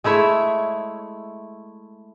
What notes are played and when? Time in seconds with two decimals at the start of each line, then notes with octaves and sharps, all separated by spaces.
0.04 G#3 A3 E4 C#5